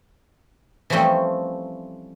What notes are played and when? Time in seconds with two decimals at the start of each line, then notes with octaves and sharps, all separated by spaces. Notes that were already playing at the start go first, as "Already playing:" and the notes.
0.90 E3 F3 G3 A3 C4 C#4